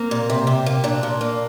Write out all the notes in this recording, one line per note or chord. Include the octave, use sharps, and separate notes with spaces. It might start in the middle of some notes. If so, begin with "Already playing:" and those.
Already playing: A#3 C4
A#2
C3
C3
A#3
A#2 D4
A#2
A#3